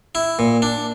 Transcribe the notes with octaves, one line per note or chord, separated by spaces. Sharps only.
E4
A#2
D4